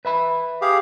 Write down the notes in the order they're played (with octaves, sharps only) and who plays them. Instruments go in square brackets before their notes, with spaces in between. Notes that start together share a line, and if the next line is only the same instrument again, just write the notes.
[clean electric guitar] B4 E5 B5
[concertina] G4 G#4 F5